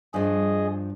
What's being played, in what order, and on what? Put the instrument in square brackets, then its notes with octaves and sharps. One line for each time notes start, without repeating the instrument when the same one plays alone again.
[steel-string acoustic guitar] G2 F3 [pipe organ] G#4 D#5